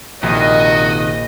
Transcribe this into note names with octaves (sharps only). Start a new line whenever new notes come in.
A#1 C3 D#3 F#4 D#5